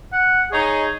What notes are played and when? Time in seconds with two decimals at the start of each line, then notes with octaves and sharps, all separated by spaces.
0.13 F#5
0.52 D#4 G#4 C#5 D#5